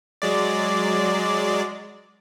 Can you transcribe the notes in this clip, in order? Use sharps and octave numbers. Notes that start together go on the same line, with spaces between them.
F#3 G#3 D5